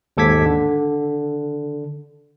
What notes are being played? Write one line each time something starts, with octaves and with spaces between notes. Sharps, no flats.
D#2 G#2 A4 D6 G#6 B6
D3